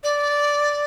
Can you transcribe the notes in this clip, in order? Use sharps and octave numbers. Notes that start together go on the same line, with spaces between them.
D5